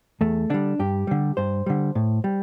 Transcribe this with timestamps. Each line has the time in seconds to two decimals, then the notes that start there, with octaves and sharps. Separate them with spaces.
0.21 E2 A3
0.50 D3 G3 D4
0.79 G2 G4
1.07 D3 G3
1.37 G2 C5
1.66 D3 G3
1.95 A2
2.24 G3